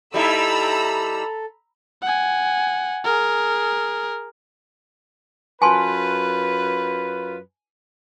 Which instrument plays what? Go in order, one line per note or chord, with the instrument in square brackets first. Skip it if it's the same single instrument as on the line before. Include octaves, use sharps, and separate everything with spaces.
[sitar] G3 D#4 E4 [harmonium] A4 [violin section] A#5 B5 E6
[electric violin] F#5 G#5
G#4 A#4
[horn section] F#2 F4 B4 [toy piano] G#5 A5 C6